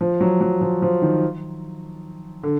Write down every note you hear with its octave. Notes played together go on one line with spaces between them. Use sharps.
F3
F#3
F#3
F3
F3
D#3
D3